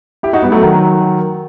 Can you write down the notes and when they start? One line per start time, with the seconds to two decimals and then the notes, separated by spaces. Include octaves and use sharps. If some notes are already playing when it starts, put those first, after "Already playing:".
0.23 E4 G4
0.33 D#4 F#4
0.43 G3 B3
0.52 F#3 A3
0.62 D#3 F#3